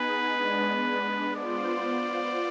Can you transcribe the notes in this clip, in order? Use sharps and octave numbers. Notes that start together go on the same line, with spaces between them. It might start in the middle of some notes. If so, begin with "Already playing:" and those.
Already playing: B3 D#4 G#4 B4
G#3 B3 D4
B3 F4 C5 D5